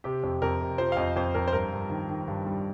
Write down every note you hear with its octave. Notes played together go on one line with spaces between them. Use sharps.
C3 G4
F2
F2 A#4
C3
F3 C5
F5
F2 D#5
F2 C5
F2 A#4
C5
G2 A#4
G2
D#3
D#3
G2
G3